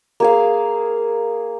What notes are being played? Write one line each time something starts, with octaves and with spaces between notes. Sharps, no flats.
A#3 G#4 F5